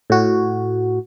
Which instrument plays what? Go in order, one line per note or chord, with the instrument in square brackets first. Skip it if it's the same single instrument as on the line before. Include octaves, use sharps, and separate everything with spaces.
[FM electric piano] A2 F#4